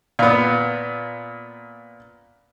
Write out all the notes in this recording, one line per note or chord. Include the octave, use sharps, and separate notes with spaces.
A#2 B3